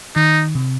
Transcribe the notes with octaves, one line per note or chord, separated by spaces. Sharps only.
D#3 D#4
C3